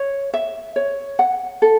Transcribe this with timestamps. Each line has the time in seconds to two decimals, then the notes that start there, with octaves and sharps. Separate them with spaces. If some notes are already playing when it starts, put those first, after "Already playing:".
Already playing: C#5
0.34 E5
0.76 C#5
1.19 F#5
1.62 A4